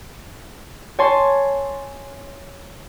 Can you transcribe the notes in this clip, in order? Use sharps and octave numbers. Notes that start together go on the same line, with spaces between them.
C#5 G#5 A5 C6